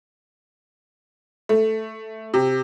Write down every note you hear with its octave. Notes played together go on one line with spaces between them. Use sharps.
A3
C3